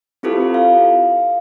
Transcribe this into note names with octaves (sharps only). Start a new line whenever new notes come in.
C4 E4 F4 G4 A4 B4
F5